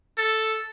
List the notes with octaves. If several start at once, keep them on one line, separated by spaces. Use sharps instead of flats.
A4